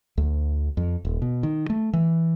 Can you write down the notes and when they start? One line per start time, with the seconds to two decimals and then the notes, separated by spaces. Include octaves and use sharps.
0.18 D2
0.77 F2
1.05 D#1
1.22 B2
1.43 D#3
1.70 A3
1.93 E3